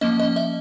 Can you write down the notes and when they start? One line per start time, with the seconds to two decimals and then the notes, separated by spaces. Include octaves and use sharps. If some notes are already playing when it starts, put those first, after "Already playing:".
0.01 F3 A#3 C#4 D#5
0.20 D#5
0.36 E5